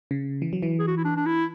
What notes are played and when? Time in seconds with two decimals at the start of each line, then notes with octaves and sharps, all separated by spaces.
0.11 C#3
0.42 E3
0.53 F#3
0.63 E3
0.79 G#4
0.87 F#4
0.97 E4
1.04 D4
1.16 D4
1.26 E4